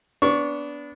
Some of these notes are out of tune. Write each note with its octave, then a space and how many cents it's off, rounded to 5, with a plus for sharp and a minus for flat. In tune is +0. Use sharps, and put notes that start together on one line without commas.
B3 +0 D4 -20 C#6 +0